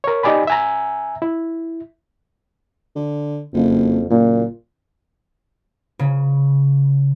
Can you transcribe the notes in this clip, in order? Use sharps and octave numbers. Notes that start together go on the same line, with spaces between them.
A#4 C#5
D#4 G4 D5 G#5 B5
E5 G#5 A#5
E4
D3
F#1 F2
F#1 A#2
C#3